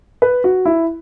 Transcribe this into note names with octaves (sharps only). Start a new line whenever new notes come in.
B4
F#4
E4